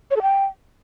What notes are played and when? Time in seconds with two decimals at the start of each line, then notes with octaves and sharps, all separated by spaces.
0.11 C#5
0.16 A4
0.22 G5